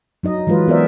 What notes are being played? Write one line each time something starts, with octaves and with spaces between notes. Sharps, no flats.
F#3 D#4 D#5
E3 F#3 G#3 F4 B4
B3 G#4 A#4 C5 D5 E5